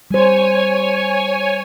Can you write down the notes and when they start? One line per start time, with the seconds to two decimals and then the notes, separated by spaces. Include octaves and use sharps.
0.11 G3 C5 C#5 G#5